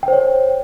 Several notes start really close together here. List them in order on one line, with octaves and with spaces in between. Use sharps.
G5 C5 C#5